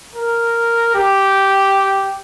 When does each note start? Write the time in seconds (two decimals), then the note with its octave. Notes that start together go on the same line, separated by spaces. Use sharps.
0.15 A#4
0.95 G4